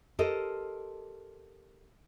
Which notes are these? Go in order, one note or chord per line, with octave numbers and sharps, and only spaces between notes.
G4 A4 A#4 C5 D#5